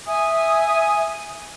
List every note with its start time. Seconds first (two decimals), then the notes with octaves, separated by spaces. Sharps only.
0.06 E5 G#5 D#6